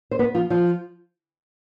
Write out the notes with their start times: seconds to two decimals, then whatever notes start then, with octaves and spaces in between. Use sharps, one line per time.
0.11 C5
0.19 B3 B4
0.34 F3 F4
0.50 F3 F4